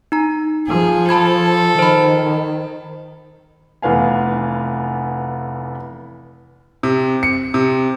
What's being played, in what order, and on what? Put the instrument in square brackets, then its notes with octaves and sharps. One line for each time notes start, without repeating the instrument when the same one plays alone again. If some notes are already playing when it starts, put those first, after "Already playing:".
[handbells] D#4 A#5
[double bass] F3 [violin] G#4
[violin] A4 [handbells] A5 B5 G#6
[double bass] D#3 [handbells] C5 B5
[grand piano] F1 E3 B3 F5 G#5
C3
C#7
C3